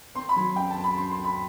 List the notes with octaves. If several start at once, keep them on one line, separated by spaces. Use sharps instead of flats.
C4 C6
B5
F#3
F#2 G5
A5
C4
B5
F#2 C6
C6
F#2
B5